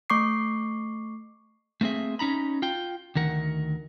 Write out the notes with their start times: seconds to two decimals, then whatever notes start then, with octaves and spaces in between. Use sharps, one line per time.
0.10 A3 C#6 D6 C7
1.81 A3 A#3 C4 G#4 E5
2.19 C#4 D#4 A#5 B5
2.62 F4 G5
3.15 D2 D#3 A#4 F#5